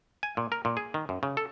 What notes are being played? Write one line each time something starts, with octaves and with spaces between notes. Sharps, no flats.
G#5
A#2
A#4
A#2
G#4
D#3
F#2
C#3
A4